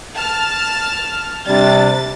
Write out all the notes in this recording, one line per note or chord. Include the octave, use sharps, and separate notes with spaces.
A5 F6
C3 G3 D4 A6